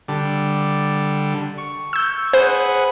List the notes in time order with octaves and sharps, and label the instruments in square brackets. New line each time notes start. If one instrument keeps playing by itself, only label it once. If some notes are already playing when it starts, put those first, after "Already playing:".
[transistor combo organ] D3 G3
C#6
[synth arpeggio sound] E6 G6
[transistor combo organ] G#4 B4 F#5 [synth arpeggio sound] C5